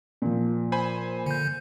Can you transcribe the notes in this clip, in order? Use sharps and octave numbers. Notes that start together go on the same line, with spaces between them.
A#2 F3
C5 G#5 B5
D3 G6